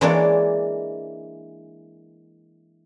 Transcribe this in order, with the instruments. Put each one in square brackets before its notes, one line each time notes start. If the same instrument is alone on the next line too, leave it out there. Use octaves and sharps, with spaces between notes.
[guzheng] E3 G#3 A#3 D4 C#5 D5